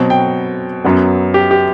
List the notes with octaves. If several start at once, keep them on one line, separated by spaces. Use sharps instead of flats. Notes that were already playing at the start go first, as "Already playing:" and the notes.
Already playing: B2 F#3 C4
G5
F#2 F#3 B3
G4
G4